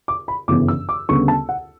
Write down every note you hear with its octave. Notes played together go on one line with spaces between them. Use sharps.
D6
B5
G1 F#2 C#3 E3 B3 D6
E6
D6
D2 C#3 G3 B3 C#6
A5
F#5